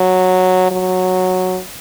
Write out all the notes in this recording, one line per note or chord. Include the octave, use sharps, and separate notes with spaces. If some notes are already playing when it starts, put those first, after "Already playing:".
Already playing: F#3
F#3